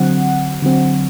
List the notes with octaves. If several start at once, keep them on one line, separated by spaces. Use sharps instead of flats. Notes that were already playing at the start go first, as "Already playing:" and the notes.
Already playing: D3 F#3 C4 F#5
D3 F#3 C4